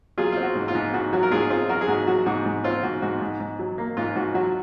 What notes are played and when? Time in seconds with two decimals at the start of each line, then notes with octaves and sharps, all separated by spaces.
0.18 F#3 F4 G#4
0.32 C4 F4
0.43 F#4
0.55 G#2
0.68 F4
0.75 G#2
0.93 G#2 F#4
1.13 F#3 F#4
1.23 A#4
1.31 G#2 F4 G#4
1.50 C4 F4 G#4
1.69 F#3 F#4 A#4
1.81 G#4
1.88 G#2 F#4
2.07 F#3 F#4
2.26 G#2 F#4
2.45 G#2
2.64 C4 F4
2.83 G#2 F#4
3.02 G#2 F#4
3.21 G#2
3.40 G#2
3.59 F#3
3.78 A#3
3.97 G#2 F4
4.16 G#2 F#4
4.34 F#3 F#4